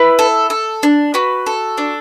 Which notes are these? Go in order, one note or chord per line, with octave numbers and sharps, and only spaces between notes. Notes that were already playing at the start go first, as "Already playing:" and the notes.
Already playing: E4 B4
A4
A4
D4
F#4 B4
A4
D4